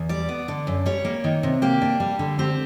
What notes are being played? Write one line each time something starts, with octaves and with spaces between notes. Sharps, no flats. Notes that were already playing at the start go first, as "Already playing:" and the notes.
Already playing: E2
G3 D5
B3
D3
F#2
G3 C#5
A#3
D#3
C3
A#3 G4
D4
G3
D3
C4 G4